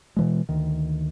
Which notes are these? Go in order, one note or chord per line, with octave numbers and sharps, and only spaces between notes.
B2 E3 G#3
D2 D#3